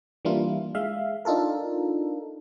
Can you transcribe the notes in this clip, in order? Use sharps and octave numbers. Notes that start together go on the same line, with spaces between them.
E3 G3 A#3 D4 E4 F4
G#3 E5 F5
D4 D#4 F4 A4 A#4